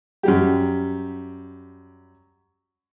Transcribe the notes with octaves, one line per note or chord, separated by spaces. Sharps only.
F#2 G3 G4